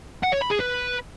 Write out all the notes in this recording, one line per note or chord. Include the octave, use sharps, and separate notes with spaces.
F#5
C#5
B5
G#4
B4